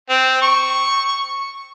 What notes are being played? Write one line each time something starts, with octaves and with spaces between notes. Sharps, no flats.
C4
C#6